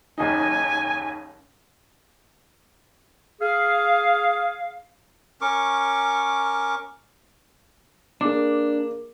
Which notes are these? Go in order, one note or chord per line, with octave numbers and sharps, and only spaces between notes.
F#1 D#2 D#4 G#5
G#4 F5
C#4 A#4 C#6 D6
A#3 D4 G#4 D6